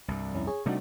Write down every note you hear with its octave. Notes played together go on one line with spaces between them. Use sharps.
C2 G2
F2 C#4 E4
G#4 C#5
C3 G3 A3 D4 D#4 F#4